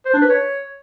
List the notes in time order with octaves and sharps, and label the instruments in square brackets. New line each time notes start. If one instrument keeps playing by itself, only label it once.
[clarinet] C5
D4
B4
C#5